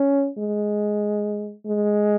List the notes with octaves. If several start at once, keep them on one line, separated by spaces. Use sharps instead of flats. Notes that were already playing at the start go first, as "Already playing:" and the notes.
Already playing: C#4
G#3
G#3